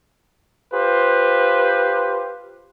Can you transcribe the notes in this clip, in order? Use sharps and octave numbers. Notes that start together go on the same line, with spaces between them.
F4 G4 B4 C5